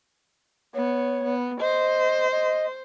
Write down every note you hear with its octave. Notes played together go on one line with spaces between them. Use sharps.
B3 C#5
B3
C5 D#5
D#5